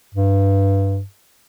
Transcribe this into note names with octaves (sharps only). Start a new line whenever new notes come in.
G2